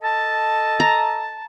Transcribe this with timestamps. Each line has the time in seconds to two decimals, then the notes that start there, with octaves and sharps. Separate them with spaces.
0.02 A4 D#5 A5
0.80 A#5